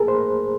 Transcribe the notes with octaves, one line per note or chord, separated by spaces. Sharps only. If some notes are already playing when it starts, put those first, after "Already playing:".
Already playing: G#4 A#4
C5